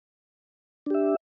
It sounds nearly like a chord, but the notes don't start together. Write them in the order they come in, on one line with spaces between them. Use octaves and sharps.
D4 G4 E5